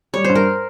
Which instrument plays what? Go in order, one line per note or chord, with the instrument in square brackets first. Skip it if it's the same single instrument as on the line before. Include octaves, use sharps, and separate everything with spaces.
[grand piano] G3 [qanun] C#5
[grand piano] G2 [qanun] C5
[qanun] A#4